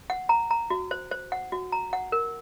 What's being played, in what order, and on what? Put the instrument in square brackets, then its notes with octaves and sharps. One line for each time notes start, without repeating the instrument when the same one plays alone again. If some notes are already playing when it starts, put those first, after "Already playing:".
[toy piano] F#5
A#5
A#5
F#4
C5
C5
F#5
F#4
A#5
F#5
A#4